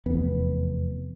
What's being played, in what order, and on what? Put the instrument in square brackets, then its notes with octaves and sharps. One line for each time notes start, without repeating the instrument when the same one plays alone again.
[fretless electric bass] F1 E2 B3